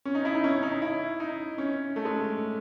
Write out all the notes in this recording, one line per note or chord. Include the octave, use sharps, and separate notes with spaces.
C#4
D#4
E4
D#4
C#4
D#4
E4
D#4
C#4
A3
G#3